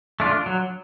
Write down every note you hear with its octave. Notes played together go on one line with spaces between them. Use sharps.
A3 D4 F4
F#3